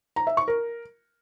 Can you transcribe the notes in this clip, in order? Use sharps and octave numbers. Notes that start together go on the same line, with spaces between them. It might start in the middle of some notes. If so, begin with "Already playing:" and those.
A#5
E5
C#6
A#4